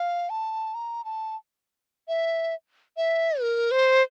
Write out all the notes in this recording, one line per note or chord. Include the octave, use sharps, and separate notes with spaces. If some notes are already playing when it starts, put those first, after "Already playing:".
Already playing: F5
A5
A#5
A5
E5
E5
A#4
C5